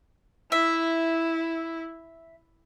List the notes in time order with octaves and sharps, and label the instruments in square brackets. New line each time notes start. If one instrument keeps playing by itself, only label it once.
[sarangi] E4 [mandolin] E5